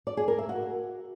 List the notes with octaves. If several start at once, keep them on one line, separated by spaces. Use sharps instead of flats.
D5
G#4
A#4
E5
F#4